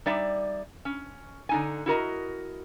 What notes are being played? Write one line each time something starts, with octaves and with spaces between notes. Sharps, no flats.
G3 D#4 D5 E5
C#4
D3 D#4 G#5
E4 F#4 A#4 D#5